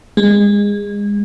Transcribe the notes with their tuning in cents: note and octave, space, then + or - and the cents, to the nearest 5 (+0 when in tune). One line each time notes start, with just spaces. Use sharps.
G#3 -25